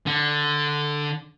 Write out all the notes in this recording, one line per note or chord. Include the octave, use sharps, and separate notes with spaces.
D3